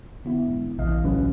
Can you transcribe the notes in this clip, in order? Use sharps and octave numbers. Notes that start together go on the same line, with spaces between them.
D3 B3 E4
G#2
A#1 C3 E3 D#5 F5
C#2 A2 C#3 F#3 C#4 B4
A#2 D3